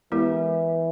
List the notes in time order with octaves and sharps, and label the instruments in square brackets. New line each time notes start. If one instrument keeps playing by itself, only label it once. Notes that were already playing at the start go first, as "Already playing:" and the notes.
[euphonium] E3 [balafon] G#3 B3 E4 G4 A#4